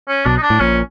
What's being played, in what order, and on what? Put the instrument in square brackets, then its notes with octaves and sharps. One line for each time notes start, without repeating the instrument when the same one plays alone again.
[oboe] C#4
[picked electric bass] B1 B2 [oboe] D4
[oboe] D#4
D4
[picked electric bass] A2
[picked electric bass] A#1 A#2 [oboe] C#4